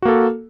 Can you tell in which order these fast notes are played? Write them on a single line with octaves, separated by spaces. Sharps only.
F#4 A#3 A4